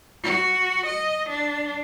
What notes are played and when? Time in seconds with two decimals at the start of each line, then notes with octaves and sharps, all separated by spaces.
0.23 F#4
0.86 D#5
1.29 D4